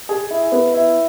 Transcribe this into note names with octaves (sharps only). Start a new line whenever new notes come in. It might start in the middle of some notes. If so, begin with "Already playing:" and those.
G#4
E4
B3
E4